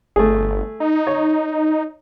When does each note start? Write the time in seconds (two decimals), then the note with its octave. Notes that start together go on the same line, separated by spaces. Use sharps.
0.16 G1 A3 G#4
0.80 D#4
1.07 C#5